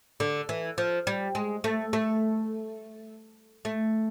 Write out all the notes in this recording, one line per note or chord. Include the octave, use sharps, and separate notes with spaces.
D3
E3
F3
G3
G#3
A3
A3
A3